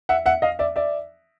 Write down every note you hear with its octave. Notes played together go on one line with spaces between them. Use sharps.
E5 F#5
E5 F#5
D#5 F5
D5 E5
D5 E5